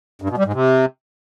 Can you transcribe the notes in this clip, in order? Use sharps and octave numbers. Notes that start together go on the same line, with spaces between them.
G2
B2
G3
G#2
C3